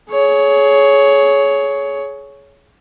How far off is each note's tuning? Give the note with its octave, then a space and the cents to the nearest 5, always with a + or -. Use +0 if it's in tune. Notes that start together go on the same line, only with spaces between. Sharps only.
G#4 +25 C#5 +10